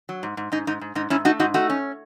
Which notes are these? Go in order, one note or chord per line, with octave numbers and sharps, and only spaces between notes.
F#3
G#2
G#2
G#2 D#4
G#2 D#4
G#2
G#2 D#4
G#2 C#4 E4
A3 D#4 F#4
G#2 D#4 F#4
A3 D#4 F#4
C#4